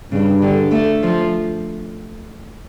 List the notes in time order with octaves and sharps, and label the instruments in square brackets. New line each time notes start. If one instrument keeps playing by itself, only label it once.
[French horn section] G2 [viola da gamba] C#3
[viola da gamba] D3
A3
F3